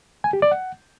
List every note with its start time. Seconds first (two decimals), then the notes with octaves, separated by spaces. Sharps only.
0.24 G#5
0.33 G4
0.42 D5
0.51 F#5